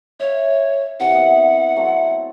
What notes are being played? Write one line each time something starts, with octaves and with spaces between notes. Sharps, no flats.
C#5 E5 F5
C3 E3 E4 F#5
B3 E5
F#3 A3 C4